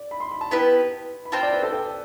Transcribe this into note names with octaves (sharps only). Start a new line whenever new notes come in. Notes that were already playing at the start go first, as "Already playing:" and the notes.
Already playing: D5
B5
C6
B5
A5
B3 E4 G4 B4 B5
B5
C4 F4 C5 G5 A5
D5
B4
A4
G5